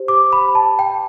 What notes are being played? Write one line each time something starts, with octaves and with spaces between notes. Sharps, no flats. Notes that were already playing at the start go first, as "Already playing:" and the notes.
Already playing: G4 C5
D6
B5
A5
G5